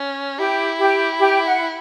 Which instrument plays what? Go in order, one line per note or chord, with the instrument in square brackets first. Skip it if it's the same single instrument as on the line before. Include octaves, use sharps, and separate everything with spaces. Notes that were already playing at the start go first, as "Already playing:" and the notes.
Already playing: [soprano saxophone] C#4
[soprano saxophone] E4 [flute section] G4
[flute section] G4
G4
F#5